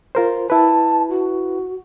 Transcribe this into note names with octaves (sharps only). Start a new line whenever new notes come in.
F4 A#4 C5
E4 B4 A5
F#4